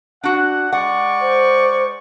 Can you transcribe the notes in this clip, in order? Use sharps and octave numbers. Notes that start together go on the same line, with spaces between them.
D4 F#4 F#5
G#3 D5 F#5 C#6
C5